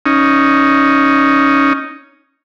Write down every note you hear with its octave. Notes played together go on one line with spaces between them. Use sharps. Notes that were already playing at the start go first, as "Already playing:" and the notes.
C#4 D#4